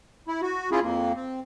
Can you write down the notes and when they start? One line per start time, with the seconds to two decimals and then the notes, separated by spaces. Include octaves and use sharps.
0.28 E4
0.42 F#4
0.72 C#4 E4 F4 G#4
0.83 F2 A#3
1.16 C4